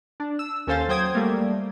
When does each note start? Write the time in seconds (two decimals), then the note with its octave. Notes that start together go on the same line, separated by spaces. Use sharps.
0.20 D4
0.39 E6
0.67 D#2 C#4 A4 C5 F5 A6
0.89 F#3 C5 G5 D#6 G#6
1.15 G3 A3 A#3